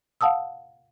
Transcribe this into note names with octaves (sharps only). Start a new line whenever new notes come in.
F5 F#5 A5 D#6 E6